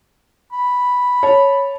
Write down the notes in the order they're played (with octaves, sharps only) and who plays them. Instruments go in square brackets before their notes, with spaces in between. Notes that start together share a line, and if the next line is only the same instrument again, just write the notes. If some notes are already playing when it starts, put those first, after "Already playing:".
[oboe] B5
[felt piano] C#5 A5